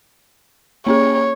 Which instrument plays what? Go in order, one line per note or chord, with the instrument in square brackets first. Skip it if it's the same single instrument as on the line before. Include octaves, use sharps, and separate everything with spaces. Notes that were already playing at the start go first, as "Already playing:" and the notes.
[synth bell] A#3 C#4 G#4 [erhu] C#5